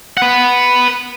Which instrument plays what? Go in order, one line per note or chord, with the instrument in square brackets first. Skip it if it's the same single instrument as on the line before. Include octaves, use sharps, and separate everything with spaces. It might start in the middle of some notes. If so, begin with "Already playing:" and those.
[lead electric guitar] B4 F#5